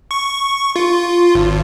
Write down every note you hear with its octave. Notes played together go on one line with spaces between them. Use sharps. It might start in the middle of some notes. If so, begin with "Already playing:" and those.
C#6
F4
G#1